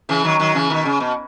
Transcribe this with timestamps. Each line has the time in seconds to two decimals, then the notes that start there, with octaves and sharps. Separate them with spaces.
0.09 C#3 E3
0.24 D#3 F#3
0.39 D#3 F#3
0.55 C#3 E3
0.70 B2 D#3
0.85 C#3
1.00 B2